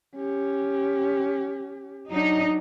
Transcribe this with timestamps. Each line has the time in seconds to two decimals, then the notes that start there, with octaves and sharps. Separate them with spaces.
0.15 C#4 G4
2.11 F#3 D4 D#4